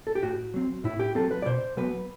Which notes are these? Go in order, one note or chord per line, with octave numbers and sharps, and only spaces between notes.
A4
G4
A2 F#4
F#3 C4
A2 E4
G4
F#3 C4 A4
B4
D5
B2 C5
F#3 B3 B4